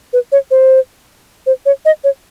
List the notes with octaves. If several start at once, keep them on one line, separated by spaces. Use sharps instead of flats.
B4
C#5
C5
C5
C#5
D#5
C#5